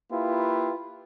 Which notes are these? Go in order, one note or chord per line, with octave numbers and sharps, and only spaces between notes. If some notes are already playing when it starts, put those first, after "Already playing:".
A#3 E4 F4 G4 B4